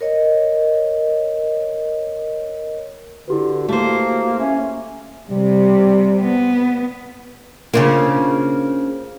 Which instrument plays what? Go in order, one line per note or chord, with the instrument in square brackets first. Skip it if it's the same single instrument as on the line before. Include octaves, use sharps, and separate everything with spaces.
[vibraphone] A#4 C#5 D#5
[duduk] D3 [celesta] E4 G4 B4 [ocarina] F#4
[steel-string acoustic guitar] A3 C5 [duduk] A#3
[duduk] C#4 [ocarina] E5
[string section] C3 [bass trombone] G3
[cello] B3
[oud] C#3 D4 F4 [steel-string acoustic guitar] A#3 C4